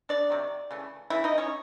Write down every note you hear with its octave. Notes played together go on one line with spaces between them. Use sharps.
D4 D5
C3 D#3 F#3
C#3 E3 A3
C#3 E3 A3 E4 E5
D#4 D#5
C#4 C#5